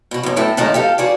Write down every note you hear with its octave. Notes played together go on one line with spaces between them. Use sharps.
B2 F#4
F#2 B2
A2 A3 A4
F#2 A#2 D#3 G#3 A3 D#4
G4 A4 F5
F#4 G#4 D5